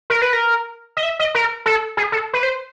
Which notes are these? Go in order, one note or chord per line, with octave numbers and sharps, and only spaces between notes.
A#4
B4
A#4
D#5
E5
D#5
A#4
A4
G#4
A4
B4
C5